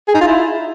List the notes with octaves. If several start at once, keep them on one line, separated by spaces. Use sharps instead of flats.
G#4
D#4
F4
E4